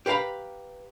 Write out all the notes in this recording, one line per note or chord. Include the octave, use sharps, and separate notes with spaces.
G4 B4 F5 A#5 B5